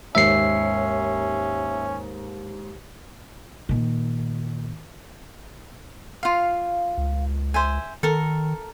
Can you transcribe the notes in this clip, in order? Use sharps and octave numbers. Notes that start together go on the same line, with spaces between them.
D#2 G#2 C#4 E5 C7 C#7
A#2 D#3
F4 F5
C#2
C5 E5 G#5
D#3 A4 A#4